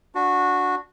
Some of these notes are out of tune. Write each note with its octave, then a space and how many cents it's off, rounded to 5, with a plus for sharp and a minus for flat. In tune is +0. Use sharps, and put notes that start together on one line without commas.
D4 -5 F#4 -15